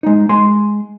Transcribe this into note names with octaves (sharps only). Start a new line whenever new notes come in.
G#3 D#4
G#3 G#5 C6